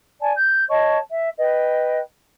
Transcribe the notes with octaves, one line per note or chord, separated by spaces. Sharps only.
D5 G#5 A5
G6
C#5 D#5 A5 C#6
E5
B4 D#5 G5